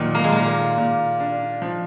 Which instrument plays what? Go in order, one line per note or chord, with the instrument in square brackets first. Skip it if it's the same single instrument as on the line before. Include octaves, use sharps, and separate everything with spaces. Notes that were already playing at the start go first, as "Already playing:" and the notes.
Already playing: [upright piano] A#2 F#3 [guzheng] D#3
[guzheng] A#3
G#3
[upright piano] A#2 [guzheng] A#3
[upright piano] A#2
D4
F3